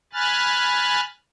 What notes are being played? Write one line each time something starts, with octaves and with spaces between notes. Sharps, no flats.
G#5 B5 F6 F#6 A6